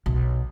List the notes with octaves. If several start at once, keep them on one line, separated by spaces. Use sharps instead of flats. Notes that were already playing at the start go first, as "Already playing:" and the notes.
B1